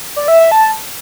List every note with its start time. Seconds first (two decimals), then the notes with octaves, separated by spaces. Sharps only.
0.16 D5
0.28 E5
0.40 E5
0.51 A5